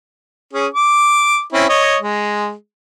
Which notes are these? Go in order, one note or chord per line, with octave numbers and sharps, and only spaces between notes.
C#4 G#4
D6
C4 C#4 E4
C#5 D#5
G#3